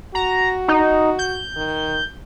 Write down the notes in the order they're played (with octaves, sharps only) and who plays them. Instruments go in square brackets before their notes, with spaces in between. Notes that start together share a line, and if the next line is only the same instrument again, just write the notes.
[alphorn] F#4 [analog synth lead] A#5
[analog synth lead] D#4
G6
[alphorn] D#3